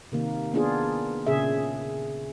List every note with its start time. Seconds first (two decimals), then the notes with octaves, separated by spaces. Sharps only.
0.12 C3 D#3 A#3
0.53 A#3 B3 D4 F4 G#4
1.26 A#2 C#3 G#4 E5